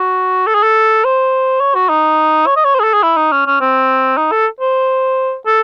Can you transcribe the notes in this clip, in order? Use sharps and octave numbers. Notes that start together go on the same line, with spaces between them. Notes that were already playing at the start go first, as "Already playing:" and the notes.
Already playing: F#4
A4
G#4
A4
C5
C#5
F#4
D#4
C#5
D#5
C#5
C5
G#4
A4
G#4
E4
D#4
C#4
C#4
C4
D#4
A4
C5
A4